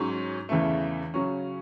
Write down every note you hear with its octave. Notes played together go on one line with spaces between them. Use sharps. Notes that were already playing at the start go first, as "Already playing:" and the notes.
Already playing: G#2 F#3 C#4
E2 C#3 E3 A3
C#3 F#3 C#4